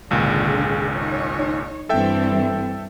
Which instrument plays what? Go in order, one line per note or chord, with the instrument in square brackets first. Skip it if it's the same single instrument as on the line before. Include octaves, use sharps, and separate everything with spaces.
[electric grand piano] G#1 C#2 A#2 [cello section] D3 G#4
[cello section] D#4 C#5
[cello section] G2 E3 C4 [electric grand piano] A4 E5 G5